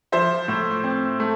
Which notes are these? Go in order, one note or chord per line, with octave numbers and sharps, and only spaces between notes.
F3 C5 E5
A2
C4
A3